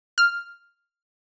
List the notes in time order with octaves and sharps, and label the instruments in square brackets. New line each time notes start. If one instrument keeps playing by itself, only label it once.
[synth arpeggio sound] F6